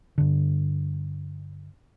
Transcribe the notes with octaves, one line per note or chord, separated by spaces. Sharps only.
G2 D3